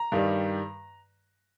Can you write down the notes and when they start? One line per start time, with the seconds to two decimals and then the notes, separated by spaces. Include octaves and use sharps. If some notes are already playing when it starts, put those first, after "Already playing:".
Already playing: A#5
0.12 G2 D#3 G3